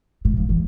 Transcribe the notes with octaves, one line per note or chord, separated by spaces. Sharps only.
A2
F3
E3